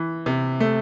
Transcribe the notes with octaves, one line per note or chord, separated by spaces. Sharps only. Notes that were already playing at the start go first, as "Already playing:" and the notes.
Already playing: E3
C3
A3